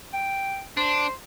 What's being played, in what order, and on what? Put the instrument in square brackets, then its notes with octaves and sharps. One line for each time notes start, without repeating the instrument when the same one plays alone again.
[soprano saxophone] G5
[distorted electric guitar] D4 [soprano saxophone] C5